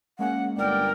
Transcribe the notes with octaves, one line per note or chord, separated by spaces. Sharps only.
G#3 A#3 C#4 F#5
G1 A#4 D5 G5